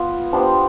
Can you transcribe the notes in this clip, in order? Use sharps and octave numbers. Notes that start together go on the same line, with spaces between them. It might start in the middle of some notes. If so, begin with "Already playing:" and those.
Already playing: B3 F4 B4
B3 D4 G4 C5